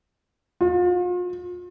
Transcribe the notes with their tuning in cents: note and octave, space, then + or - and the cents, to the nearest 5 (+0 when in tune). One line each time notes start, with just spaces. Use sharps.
F4 +40